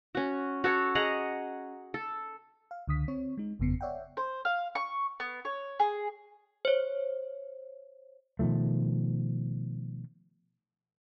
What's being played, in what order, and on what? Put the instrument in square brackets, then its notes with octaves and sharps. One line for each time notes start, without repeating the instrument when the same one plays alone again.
[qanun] C#4 F#4
F#4 A4 C#5
G#4 D#5 F#5 A#5
A4
[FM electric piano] F5
C#2 D3 D#6 B6
C4 C#5
G#3 D#4
G1 F2 C#3 B3 C7 C#7
C#5 D5 E5 F#5 G5
[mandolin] C5
F5
C#6
B3
C#5
G#4
[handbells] C5 C#5
[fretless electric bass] B2 D#3 F3 A3